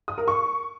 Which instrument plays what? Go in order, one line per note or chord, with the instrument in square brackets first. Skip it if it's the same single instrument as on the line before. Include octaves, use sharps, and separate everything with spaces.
[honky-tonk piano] D#6
A#4
C#6